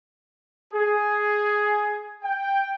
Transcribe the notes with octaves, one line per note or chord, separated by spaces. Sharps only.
G#4
G5